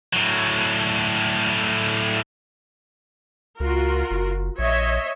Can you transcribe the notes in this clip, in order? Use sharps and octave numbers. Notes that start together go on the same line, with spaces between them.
A2 F#3
C#2 F4 F#4 A#4
F#1
A#1 C#5 D#5 E5